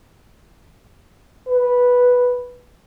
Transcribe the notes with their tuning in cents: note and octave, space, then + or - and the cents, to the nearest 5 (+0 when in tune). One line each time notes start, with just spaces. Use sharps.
B4 -5